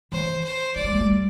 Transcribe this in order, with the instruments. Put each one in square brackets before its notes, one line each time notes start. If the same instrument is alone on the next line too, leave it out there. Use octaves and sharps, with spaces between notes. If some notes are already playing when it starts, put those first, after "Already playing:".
[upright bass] E3 [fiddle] C5
[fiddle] C5
[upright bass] F3 [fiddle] D5
[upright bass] G3
A3
G3